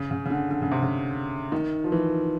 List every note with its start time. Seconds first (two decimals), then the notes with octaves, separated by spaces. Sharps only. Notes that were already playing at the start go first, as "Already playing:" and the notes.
Already playing: C#3
0.11 C#3
0.25 C#3
0.30 D3
0.51 D3
0.62 C#3
0.71 C3
0.82 C#3
1.52 D#3
1.84 F3
1.92 E3